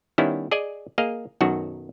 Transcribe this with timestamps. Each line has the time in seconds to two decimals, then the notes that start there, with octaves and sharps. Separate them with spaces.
0.18 D#3 G3 B3 C#4 E4
0.51 G#4 D5 D#5 G#5
0.98 A#3 G#4 D#5 F5
1.41 B1 F#2 D#3 F#4